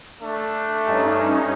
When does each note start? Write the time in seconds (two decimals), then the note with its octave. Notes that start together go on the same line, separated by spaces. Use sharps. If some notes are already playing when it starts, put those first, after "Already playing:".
0.21 A3 D4
0.86 G2 C#4 D#4